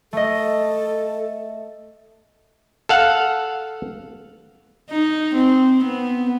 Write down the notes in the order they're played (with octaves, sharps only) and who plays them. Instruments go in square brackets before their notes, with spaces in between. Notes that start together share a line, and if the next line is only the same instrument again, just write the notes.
[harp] A3 D#5 [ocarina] A4
[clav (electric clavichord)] A4 F5 F#5
[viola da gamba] D#4
C4
B3